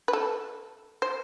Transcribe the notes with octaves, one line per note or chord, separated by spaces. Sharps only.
B4
A4
C5